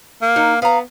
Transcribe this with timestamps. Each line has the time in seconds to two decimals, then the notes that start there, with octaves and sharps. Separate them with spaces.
0.22 A#3
0.36 D#4
0.62 B3 F5 A#5